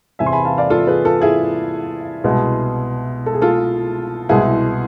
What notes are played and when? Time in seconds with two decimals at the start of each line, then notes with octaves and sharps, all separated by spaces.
0.19 E2 C3 E3 E5 G#5
0.26 C6
0.32 G#5 B5
0.45 F5 A5
0.58 D5 F5
0.70 F4 A4
0.87 G#4 B4
1.05 F4 A4
1.21 E4 G#4
2.24 C2 B2 G#3
3.26 A4
3.34 G#4
3.42 F4 A4
4.29 C2 B2 G#3 E4 G#4